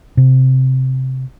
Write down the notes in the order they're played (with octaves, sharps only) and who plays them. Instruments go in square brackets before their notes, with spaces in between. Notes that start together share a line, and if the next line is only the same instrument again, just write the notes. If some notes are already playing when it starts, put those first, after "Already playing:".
[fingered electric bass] C3